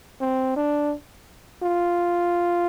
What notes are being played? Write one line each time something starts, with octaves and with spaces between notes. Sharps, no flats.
C4
D4
F4